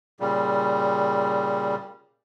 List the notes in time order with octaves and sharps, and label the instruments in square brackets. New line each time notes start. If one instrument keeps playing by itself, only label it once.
[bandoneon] A#2 C#3 G3